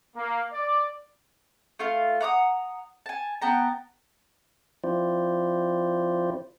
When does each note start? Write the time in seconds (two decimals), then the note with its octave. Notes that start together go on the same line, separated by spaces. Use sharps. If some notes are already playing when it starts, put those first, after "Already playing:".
0.16 A#3
0.53 D5
1.79 A3 F4 F5
2.21 F#5 A#5 D6 D#6
3.06 G#5 A5
3.42 B3 G5 A5 A#5
4.84 F3 C4 E4 F4 C5 D5